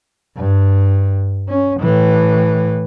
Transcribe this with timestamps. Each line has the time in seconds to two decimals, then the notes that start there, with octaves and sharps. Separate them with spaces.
0.37 G2
1.49 C#4
1.80 A2 E3